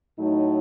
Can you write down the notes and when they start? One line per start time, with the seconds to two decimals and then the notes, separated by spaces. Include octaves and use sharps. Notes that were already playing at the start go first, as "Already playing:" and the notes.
0.18 A2 F#3 A3 D#4